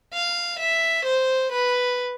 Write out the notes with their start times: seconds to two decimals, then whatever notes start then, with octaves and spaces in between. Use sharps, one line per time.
0.13 F5
0.59 E5
1.06 C5
1.53 B4